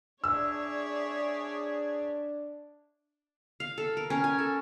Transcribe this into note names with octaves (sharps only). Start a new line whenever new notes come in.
D4 G#4 C#5 D5 E5 E6
F5
A4
A#4
C#4
G#5
A4